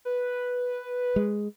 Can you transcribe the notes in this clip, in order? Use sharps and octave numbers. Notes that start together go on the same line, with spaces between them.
B4
G#3